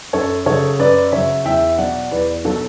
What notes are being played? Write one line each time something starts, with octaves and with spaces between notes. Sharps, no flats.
F#2 A4 C#5
C#3 F#3 A4 C#5
F#2 B4 D5
C#3 F#3 C#5 E5
E2 E5 G5
B2 F#3 D5 F#5
E2 B4 D5
B2 F#3 F#4 A4